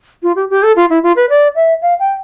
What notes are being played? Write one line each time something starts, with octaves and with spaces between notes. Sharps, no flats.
F4
G4
G4
A4
F4
E4
F4
B4
D5
E5
F5
G5